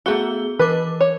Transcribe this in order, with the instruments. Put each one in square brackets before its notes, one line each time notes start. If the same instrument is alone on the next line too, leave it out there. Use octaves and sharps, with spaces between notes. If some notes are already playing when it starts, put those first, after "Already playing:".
[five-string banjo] A3 F#4 [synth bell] B3 G#4 G7
[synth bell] E3 A#4 D6 [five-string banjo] B4
[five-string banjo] C#5